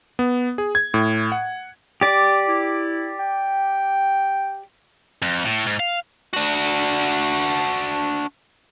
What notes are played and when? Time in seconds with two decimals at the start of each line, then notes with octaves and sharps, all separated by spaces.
0.19 B3
0.58 G#4
0.75 G#6
0.94 A2
1.32 F#5
2.01 G4 D5
2.48 E4
3.19 G5
5.22 F2
5.44 A2
5.67 G#2
5.80 F5
6.34 D4 F#4